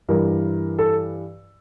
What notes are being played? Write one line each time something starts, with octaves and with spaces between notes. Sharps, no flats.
G2 E3 A#4
A4